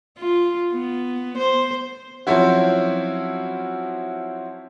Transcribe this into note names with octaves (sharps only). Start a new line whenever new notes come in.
F4
B3
C5
F3 F#3 C4 C#4 E4 F#4